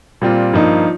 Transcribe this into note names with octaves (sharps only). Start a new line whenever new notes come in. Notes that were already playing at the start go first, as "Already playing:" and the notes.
A#2 G3 C4 F4
G2 F3 A#3 D#4